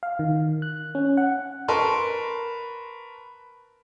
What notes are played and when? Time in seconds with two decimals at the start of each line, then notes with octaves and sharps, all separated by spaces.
0.03 F5
0.19 D#3
0.62 F#6
0.95 C#4
1.17 F#5
1.68 A#4 B4 A5 C6 C#6